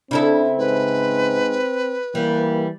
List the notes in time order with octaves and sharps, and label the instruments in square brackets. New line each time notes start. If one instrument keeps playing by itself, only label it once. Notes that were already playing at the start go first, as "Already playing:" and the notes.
[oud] C#3 E4 A4 [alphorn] C4 [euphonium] D4
[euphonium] G#2 [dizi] B4
[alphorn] E3 [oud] G3 [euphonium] A#3